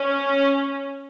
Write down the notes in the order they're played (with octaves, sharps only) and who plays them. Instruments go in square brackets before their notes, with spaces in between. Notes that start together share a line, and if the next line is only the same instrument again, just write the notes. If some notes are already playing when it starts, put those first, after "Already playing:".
Already playing: [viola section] C#4